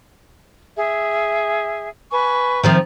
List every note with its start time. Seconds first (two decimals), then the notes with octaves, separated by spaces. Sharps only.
0.78 G#4 E5
2.11 B4 G#5 C#6
2.63 D#3 F3 C4 E5